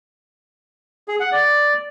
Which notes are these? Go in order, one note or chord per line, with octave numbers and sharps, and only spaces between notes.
G#4
F#5
D5